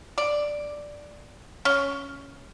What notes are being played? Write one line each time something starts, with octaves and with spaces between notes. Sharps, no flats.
D5
C#4